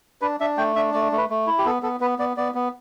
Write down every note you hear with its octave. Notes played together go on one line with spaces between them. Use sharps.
D4 B4
D4 E5
A3 G5
D4 E5
A3 D5
A3
B4
A3
E4
G4
B3 A4
B3 A4
B3 B4
B3 D5
B3 D5
B3